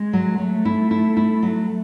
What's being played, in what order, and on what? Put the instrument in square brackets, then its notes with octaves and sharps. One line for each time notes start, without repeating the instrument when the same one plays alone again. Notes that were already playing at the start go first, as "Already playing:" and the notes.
Already playing: [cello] G#3
[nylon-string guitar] F#3
[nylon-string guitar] F#3 [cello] A3
[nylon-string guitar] E4
E4
E4
F#3